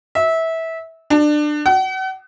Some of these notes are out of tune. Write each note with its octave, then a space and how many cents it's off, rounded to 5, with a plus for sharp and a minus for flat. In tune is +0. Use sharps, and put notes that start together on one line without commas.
E5 -20
D4 +25
F#5 +40